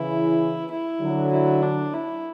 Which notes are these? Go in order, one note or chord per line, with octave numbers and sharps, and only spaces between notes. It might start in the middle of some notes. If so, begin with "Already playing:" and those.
Already playing: C#3 E3 E4
E4
D3 F#3
E4
D4
E4